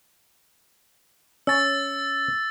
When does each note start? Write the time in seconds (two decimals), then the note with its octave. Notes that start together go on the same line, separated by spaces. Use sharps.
1.47 C#4 E6 A6